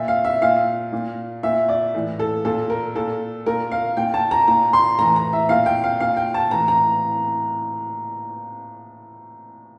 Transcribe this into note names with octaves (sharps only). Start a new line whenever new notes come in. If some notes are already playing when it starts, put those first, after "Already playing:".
Already playing: A#2 E5
F5
E5
A#2 F5
A#2
A#2 E5
D5
A2 E3
A4
A#2 A4
A#4
A#2 A4
A#2 A#4
F5
A#2 G5
A5
A#5
A#2 A#5
C6
A2 E3 A#5
A#5
E5
A#2 F5
G5
F5
A#2 F5
G5
A5
A2 E3 A#5
A#5